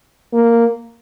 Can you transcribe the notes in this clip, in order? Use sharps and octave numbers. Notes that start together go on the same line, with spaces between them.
A#3